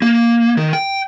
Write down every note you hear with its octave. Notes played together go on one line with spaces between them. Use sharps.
A#3
D#3
G5